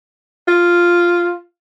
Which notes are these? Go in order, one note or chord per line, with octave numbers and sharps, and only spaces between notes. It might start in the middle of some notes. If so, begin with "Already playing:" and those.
F4